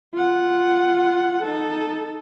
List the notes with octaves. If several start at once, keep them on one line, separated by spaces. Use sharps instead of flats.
F4 F#5
D#4 A4